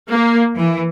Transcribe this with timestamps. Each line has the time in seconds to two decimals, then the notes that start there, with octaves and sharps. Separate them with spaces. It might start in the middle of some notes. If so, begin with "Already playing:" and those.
0.11 A#3
0.57 E3